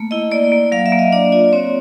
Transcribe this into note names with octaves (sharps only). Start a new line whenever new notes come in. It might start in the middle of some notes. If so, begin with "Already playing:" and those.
Already playing: A3 A#3
E4 D#5
A#3 D5
A#3
F#3 F5
E5
A#3
D#5
D4 D5
F4 D5
C4 C#5